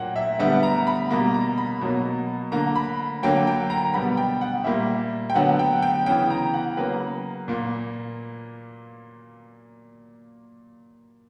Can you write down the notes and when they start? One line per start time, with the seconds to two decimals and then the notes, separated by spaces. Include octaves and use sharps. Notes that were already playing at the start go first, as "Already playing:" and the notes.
Already playing: A#2 F#3 A#3 F#5 G5
0.16 E5
0.39 D3 G3 B3 E5
0.63 A#5
0.87 B5
1.10 B2 G3 A#3 A#5
1.34 A#5
1.58 B5
1.81 B2 F#3 A#3
2.52 D3 A#3 A#5
2.75 B5
3.23 D3 F#3 A#3 G5
3.47 G5
3.70 A#5
3.94 B2 G3 B3 B5
4.17 G5
4.41 F#5
4.64 A#2 G3 A#3 E5
5.30 G5
5.35 D3 F#3 B3 F#5
5.59 G5
5.82 G5
6.06 C#3 E3 B3 G5
6.30 A#5
6.54 F#5
6.77 C#3 F#3 A#3 B4
7.48 A#2 A#3